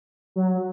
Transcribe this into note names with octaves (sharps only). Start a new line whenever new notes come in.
F#3